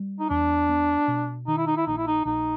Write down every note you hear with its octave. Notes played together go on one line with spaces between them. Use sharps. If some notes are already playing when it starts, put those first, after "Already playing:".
Already playing: G3
D#4
E2 D4
B3
B2
D#3 D#4
E4
D#4
E4
A#1 D#4
E4
D#4
A#1 D#4